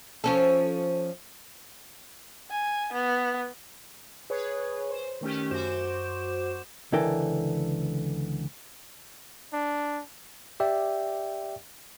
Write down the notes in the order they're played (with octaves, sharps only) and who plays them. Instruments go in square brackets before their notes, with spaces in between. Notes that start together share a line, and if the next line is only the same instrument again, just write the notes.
[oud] F3 C#4 A4
[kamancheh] G#5
B3
[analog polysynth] G#4 B4 C#5
C5
D#3 A3 C#4 G4
F#2 F#4 C5 D6 G6 E7
[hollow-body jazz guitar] C#2 D3 E3 A4 A#4 G5
[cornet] D4
[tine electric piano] G4 D5 E5 G5